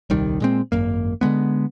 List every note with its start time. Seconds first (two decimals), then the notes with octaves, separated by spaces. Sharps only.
0.10 D#1 C2 D#3 G3
0.40 A#2 G#3 C4
0.72 G#1 F#2 A#3
1.21 D3 E3 G#3 B3